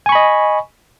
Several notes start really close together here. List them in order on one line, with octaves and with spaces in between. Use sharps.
G#5 C#6 B5 D#5